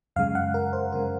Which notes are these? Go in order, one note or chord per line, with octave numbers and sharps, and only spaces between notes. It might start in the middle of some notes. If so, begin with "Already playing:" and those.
F#2 C#3 G#3 F5
F#5
A#4
C5
F#2 C#3 G#3 A#4